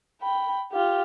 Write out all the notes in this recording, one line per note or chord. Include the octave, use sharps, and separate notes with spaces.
G5 B5
F4 G4